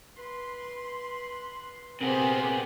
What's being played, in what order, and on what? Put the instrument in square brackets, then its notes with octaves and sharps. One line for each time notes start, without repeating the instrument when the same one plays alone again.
[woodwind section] B4 B5 C6
[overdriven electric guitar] C3 B3 [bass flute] C4 [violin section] G4 G#4 C5 [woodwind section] A#4